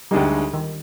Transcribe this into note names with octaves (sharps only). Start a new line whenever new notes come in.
D2 D3 G3 G#3 D#4
D#3